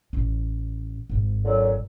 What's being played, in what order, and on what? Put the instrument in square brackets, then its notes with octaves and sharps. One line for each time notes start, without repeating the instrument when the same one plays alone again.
[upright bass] A1 C#4
G#1 G#2
[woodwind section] A#2 D3 F#3